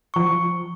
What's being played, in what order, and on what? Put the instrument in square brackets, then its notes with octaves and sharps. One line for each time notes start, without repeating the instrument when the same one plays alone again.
[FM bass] F3 [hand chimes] C#6